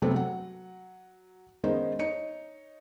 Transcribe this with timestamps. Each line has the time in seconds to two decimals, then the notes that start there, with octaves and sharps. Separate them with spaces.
0.02 C3 F#3 A3 B3 C4
0.14 F#3 F#5
1.64 D#3 G#3 B3 C#4 D#4 C5
1.99 D#4 C#5 C#7